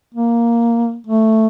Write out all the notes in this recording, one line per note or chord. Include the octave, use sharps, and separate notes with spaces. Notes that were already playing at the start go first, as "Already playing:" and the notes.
A#3
A3